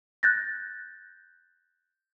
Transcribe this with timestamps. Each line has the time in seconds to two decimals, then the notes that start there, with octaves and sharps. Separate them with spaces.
0.23 F#6 G6 A6 A#6